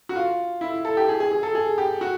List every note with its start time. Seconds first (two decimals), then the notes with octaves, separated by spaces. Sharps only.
0.09 F#4
0.16 F4
0.61 E4
0.85 A4
0.97 G4
1.09 G#4
1.20 G#4
1.32 G#4
1.43 A4
1.55 G#4
1.78 G4
2.01 F#4